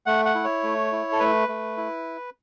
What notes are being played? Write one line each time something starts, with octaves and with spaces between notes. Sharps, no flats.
A3 F#5
F#5
E4
C#5
A3
E4
A4
A3 B4
A3
E4